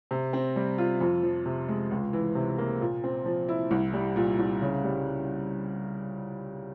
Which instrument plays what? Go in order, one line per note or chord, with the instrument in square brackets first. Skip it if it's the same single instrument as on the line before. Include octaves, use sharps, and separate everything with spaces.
[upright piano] C3
C4
G3
F4
F2
F3
C3
G#3
C#2
E3
C3
A#3
A#2
C4
F3
E4
C2
G3
A#2
C2
C#3
G3